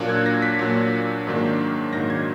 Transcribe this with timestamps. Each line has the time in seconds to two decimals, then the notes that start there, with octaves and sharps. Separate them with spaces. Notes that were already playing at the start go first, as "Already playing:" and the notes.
Already playing: A#2 F#3 A#3 D4 F#6
0.09 G#6
0.26 A#6
0.42 B6
0.59 A#2 F#3 A#3 D4
1.27 G#2 D#3 F#3 A#3 D4
1.93 G#2 D#3 F#3 A#3 D4 A#6
2.10 G#6